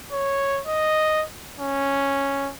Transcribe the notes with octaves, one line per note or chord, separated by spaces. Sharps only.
C#5
D#5
C#4